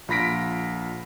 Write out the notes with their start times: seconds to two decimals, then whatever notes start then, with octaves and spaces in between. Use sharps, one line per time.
0.08 A#1 F4 B5 A#6 B6 D7